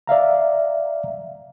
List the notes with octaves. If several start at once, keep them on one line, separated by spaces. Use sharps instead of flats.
D5 E5 F5 A#5